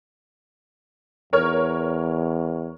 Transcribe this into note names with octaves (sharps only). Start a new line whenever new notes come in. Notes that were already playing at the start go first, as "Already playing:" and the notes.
E2 A#4 C#5 F6